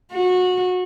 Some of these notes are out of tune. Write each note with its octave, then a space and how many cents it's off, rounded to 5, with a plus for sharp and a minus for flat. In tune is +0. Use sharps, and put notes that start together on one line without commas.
F#4 -25